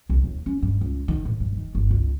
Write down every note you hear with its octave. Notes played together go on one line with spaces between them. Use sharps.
C2
D#2
C#4
G2
C#2
D#3
A2
G2
D#3
G1
C#2